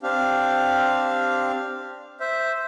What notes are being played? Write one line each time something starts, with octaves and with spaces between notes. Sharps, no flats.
C4 D4 G4 F5
C5 E5